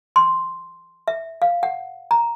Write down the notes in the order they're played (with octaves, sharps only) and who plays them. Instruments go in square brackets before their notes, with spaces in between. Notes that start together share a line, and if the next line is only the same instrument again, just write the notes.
[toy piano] C6
E5
F5
F#5
A#5